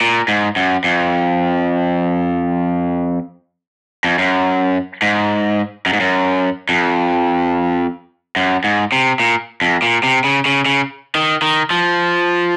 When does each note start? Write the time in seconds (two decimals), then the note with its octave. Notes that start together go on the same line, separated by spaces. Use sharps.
0.01 A#2
0.28 G#2
0.56 F#2
0.84 F2
4.04 F2
4.18 F#2
5.02 G#2
5.86 F#2
5.93 G#2
6.00 F#2
6.69 F2
8.36 F#2
8.64 G#2
8.92 C3
9.20 A#2
9.62 F2
9.82 A#2
10.03 C3
10.24 C#3
10.46 C#3
10.66 C#3
11.15 D#3
11.42 D#3
11.70 F3